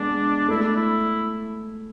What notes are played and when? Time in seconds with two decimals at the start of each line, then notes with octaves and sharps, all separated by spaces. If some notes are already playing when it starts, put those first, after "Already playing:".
Already playing: G#3 B3 D4
0.48 A3 E4
0.63 D4
0.76 E4